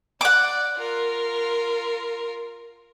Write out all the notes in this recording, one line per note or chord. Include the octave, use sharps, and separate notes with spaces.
D5 F#5 D6
F4 A#4